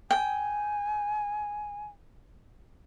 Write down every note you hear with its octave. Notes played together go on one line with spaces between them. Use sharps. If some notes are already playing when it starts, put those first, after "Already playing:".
G5 G#5